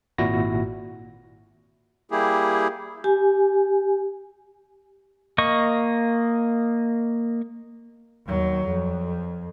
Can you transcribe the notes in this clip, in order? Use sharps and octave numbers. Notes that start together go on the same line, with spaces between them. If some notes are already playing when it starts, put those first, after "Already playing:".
G#1 A#2 E4 F#4 A#6
G3 A#3 E4 G4 G#4
G4 G#5
A#3 D#5 C#6
D#2 F#3
F2